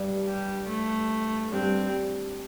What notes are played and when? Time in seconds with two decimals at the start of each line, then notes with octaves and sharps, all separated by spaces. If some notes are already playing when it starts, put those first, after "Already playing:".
Already playing: G2
0.26 G3
0.68 A3
1.51 G2 C4
1.62 G2